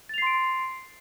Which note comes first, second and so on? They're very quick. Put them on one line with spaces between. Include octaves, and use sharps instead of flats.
A6 F7 C7 C6 D7